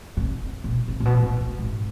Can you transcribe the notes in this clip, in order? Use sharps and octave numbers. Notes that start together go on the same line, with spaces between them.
C3
B2
C3
A#2
B2
A#2
A2
G#2